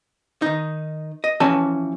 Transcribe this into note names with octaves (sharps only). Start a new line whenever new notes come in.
D#3 D#4
D#5
E3 F3 C#4 F#4 G#5 A5